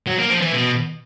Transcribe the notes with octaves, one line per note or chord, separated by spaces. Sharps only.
F#3
A#3
F3
E3
B2